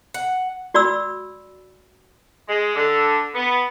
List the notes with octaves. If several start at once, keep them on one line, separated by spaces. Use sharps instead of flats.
F#5
F#4 D5 B5 E6
G#3
D3
B3